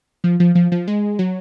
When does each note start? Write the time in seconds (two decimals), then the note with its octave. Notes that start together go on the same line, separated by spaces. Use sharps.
0.24 F3
0.40 F3
0.55 F3
0.72 F3
0.88 G#3
1.19 F#3